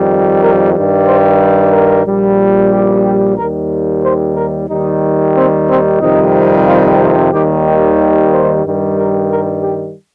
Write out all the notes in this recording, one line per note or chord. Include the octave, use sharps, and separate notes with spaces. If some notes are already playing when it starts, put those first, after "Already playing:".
Already playing: F2 D#3 G3
A#4
G2 D#3 G3
C5
A#4
A#1 A#2 G3
G4
G4
D#2 D#3 G3 A#4
C5
A#4
D#2 D#3 G3 D#4
C4
C4
F2 C3 D#3 G3 D#4
F4
C4
D#2 D#3 G3 G4
G4
C5
G2 D#3 G3
A#4
A#4
G4